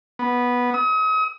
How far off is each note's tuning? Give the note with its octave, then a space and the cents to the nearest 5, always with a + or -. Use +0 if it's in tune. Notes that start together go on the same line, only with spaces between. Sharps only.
B3 -10
D#6 +40